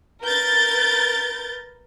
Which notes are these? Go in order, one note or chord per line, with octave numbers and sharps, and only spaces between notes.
A#4 B4 G6 A6